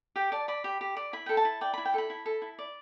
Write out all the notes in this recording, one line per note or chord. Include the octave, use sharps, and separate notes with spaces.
G4 G5
D5 A5
D5 B5
G4
G4
D5
E4 B5
A4 G5
A5
E4
D5 G5
E4 B5
G5
A4 B5
E4
A4
E4
D5